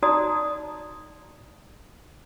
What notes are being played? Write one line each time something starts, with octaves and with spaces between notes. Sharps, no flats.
D#4 F#4 D5 D#5 A#5 D#6